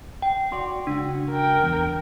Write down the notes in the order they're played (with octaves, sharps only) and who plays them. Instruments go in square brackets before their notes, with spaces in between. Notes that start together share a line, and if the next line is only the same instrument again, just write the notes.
[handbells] G5
[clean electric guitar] F#4 D5 [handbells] C6
[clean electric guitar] C#2 F#4 [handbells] D4
[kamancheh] A#4 G5
[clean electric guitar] E2